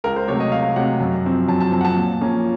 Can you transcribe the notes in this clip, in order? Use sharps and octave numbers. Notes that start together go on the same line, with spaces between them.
C#2 A#4
C5
C3 F#3 A3 C#5
D#5
C#2 F5
C3 F#3 A3 F#5
F#2
F3 C4
F#2 A5
A5
F3 C4 A5
F#5
A5
A#2
F3 A#3 C#4